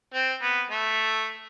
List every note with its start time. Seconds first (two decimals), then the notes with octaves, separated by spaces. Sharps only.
0.14 C4
0.42 B3
0.71 A3